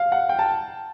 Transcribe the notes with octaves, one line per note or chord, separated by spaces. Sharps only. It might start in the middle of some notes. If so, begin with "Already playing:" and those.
Already playing: F5
F#5
G5
A5